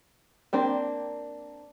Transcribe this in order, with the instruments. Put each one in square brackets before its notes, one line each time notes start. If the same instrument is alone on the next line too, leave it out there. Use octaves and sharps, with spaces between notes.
[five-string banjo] A#3 C4 D4 C5